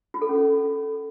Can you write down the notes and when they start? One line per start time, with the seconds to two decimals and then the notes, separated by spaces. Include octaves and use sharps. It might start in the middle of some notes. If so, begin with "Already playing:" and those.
0.14 F4
0.22 A4
0.29 C#4